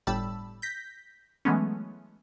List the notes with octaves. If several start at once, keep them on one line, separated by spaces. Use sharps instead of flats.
G1 A2 G3 A5 B5 E6
G6 A#6 B6
E3 F#3 G#3 A3 B3 C#4